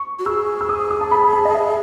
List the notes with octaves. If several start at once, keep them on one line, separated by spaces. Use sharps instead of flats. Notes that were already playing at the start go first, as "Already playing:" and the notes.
Already playing: C#6
F#4
G#4 E6
E6
D#6
D#6
A5
B5
A5
D#5
E5